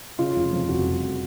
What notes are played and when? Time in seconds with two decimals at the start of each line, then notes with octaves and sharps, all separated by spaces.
0.19 C#3 F4
0.36 F1
0.52 F2
0.69 F1 F#4
0.85 F1